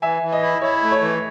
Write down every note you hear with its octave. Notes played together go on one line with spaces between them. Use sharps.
E3 E5 G#5
E3
D#5
E4
E4 C#5
A3
C#5
E3